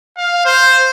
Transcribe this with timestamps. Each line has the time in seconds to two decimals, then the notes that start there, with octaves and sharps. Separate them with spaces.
0.17 F5
0.46 C5